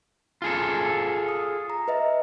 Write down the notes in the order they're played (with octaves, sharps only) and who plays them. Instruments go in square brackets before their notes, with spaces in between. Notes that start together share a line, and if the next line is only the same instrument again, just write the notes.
[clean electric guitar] F4 G#4 A4
[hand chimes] D#6
A#5
B4 D#5 E5